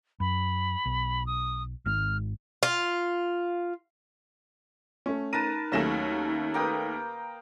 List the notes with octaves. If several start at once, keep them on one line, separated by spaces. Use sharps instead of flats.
F#2 B5
B1
D#6
G#1 G#2 F6
F4
A3 C#4
D#4 A#4 B4 A5 D#7
D#2 F#3 A3 C#4 A#6 E7
A#3 A#4 B4 G5 D#6